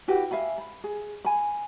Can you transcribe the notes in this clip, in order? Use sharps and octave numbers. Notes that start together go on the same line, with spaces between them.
E4 F#4 G4 B4
E5 F5 G#5 B5
B5
G#4
G#5 B5